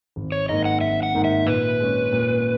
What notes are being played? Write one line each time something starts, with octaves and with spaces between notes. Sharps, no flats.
G#1
C#5
G#2 D#3 A#3 D#5
F#5
G#1 E5
F#5
G#2 D#3 A#3
E5
A#2 B4
G#3 C#4
A#2